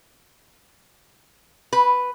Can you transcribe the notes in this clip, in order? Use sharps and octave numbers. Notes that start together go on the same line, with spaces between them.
B4